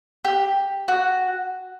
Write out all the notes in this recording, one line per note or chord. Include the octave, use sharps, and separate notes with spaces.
G4
F#4